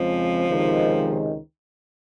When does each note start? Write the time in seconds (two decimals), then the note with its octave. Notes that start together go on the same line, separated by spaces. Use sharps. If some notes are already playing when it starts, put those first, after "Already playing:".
Already playing: F2 C#3 F3 G#3 C4
0.47 C#2 C3 D#3 G#3 D#4